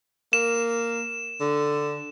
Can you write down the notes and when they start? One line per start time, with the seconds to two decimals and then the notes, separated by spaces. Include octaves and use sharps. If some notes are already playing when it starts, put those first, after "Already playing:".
0.33 A#3 E7
1.40 D3